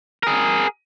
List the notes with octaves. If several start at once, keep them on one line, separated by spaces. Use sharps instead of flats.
G#4 A#4